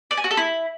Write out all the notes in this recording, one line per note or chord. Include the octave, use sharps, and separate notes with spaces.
D5
G#5
F#4
A4
E4